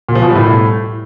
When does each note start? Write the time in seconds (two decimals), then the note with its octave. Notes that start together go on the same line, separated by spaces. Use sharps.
0.09 A#2
0.15 F3
0.22 B2
0.29 G3
0.35 A2